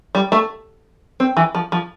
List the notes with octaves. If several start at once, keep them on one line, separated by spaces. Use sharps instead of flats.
G3
A3
C4
E3
F3
F3